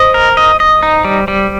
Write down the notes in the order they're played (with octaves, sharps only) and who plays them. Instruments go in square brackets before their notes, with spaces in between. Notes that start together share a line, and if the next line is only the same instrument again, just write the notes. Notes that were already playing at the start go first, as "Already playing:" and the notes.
Already playing: [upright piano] C5 [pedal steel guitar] D#5
[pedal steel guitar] A#4
D#5
D#5
D#4
G3
G3